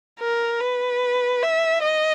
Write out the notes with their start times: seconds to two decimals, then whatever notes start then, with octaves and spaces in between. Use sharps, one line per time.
0.20 A#4
0.61 B4
1.43 E5
1.84 D#5